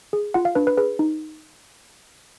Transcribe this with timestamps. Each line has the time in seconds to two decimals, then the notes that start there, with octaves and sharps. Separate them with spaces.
0.13 G#4
0.34 F4 F#5
0.45 F5
0.55 D4 B4
0.67 B4
0.78 G#4 B4
0.99 D#4